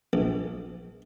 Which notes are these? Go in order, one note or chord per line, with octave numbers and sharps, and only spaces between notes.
A#1